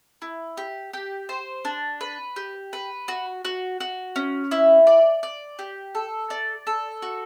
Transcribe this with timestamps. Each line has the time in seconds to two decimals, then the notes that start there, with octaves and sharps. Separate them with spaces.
0.22 E4
0.57 G4
0.93 G4
1.29 C5
1.65 D4
2.01 B4
2.36 G4
2.73 B4
3.08 F#4
3.45 F#4
3.80 F#4
4.16 C#4
4.51 E4
4.87 D5
5.23 D5
5.59 G4
5.95 A4
6.30 D5
6.67 A4
7.02 F#4